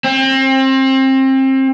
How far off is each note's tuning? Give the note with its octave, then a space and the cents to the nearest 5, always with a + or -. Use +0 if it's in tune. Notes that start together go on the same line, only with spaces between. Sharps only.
C4 +30